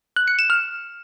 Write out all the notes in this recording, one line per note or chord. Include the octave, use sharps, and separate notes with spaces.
F#6
C#7
E7
F6